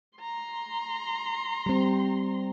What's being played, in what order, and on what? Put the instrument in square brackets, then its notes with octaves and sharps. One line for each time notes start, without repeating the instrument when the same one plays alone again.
[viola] A#5 C6
[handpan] G3 C4